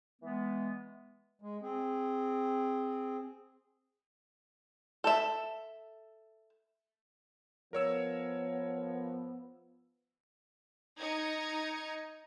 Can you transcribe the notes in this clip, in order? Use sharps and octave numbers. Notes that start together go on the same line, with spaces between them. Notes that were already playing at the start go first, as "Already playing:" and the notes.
E3 G#3 B3
G#3
C4 G#4
A4 E5
F3 B3 A#4 C#5 E6
D#4 G#6 C#7